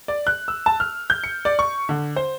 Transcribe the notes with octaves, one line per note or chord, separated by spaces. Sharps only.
D5
F#6
E6
A5
F6
G6
C#7
D5
C#6
D3
C5